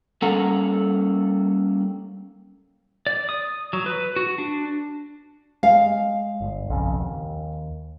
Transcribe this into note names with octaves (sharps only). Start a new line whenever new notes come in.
G3 A#3 C#4 A4 F#5 A#5
D5
D#6
F#3
B4
F#4
D4
G#3 F5
G1
B1 F2 C#3
D#2